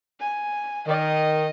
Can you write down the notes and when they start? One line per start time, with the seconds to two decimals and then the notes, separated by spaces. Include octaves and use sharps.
0.20 G#5
0.87 D#3 D#5